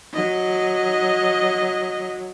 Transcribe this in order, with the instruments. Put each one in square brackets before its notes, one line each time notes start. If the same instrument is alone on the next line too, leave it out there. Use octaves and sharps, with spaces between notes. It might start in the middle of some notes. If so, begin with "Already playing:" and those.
[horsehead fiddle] F#3 [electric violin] D#5